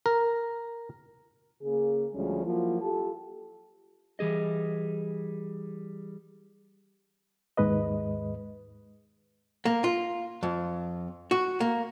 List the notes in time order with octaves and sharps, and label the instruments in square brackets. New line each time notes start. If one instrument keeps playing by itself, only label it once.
[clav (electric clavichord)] A#4
[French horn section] C#3 A#3 G#4
D2 F3 G3 G#3 C#4
F3 F#3 A#3 E4 F4
F4 G4 A4
[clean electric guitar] E3 G3 G#4 D#5
[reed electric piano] D#2 G#2 G#3 B4 D#5
[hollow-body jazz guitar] A#3
F4
F2
F#4
A#3